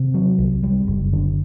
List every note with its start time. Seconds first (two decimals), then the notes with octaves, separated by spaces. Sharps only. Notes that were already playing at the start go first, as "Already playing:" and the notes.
Already playing: C3
0.14 F#3
0.38 C2
0.63 G3
0.87 F#1
1.13 D3